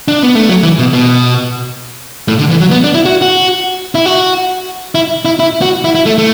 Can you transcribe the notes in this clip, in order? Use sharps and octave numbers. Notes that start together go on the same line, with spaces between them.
D4
B3
A3
F#3
E3
B2
B2
A2
D3
E3
F#3
B3
D4
E4
F#4
F#4
E4
F#4
E4
E4
E4
F#4
E4
E4
A3
A3